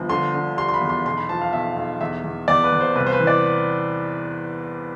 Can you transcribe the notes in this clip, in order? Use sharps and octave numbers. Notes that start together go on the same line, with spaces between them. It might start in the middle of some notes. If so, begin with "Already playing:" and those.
Already playing: G1 F3
D3 C6
D3
G3 C6
C6
B5
E2
C6
B1 C6
B5
F3 A5
F5
B1 E5
B1
E2 E5
E2
E2 D5
B4
E2
C5
C2 B4
C5
B4
E3
D5